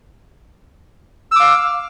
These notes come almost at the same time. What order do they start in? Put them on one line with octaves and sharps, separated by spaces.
E6 D6 F5